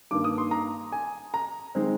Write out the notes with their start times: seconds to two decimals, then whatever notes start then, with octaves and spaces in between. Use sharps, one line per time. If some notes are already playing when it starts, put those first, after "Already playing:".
0.11 G2 D#3 A#3 D4 D6
0.24 D#6
0.38 C6
0.51 A#5
0.92 G#5
1.34 A#5
1.75 D#3 G#3 C4